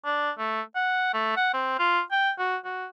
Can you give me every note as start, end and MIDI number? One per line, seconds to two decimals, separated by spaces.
0.05 0.31 62
0.38 0.61 57
0.76 1.11 78
1.13 1.32 57
1.36 1.49 78
1.54 1.75 60
1.79 2.01 65
2.12 2.31 79
2.39 2.57 66
2.65 2.86 66